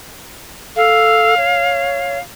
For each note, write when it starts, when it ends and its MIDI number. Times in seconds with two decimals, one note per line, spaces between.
0.76 1.35 69
0.76 2.20 77
1.37 2.18 73